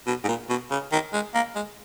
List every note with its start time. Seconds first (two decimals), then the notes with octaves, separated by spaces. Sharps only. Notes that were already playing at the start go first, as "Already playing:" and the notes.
0.07 B2
0.24 G#2
0.28 A#2
0.50 B2
0.71 C#3
0.92 D#3
1.13 G#3
1.35 A#3
1.55 G#3